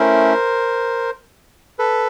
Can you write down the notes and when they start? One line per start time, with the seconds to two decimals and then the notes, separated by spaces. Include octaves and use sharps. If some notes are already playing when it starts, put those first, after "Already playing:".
Already playing: A3 C#4 E4 A#4 C5
1.79 A4 B4